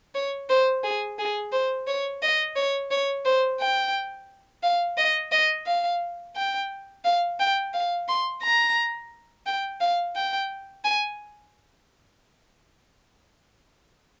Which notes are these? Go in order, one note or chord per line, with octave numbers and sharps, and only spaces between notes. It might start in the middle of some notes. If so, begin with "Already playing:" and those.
C#5
C5
G#4
G#4
C5
C#5
D#5
C#5
C#5
C5
G5
F5
D#5
D#5
F5
G5
F5
G5
F5
C6
A#5
G5
F5
G5
G#5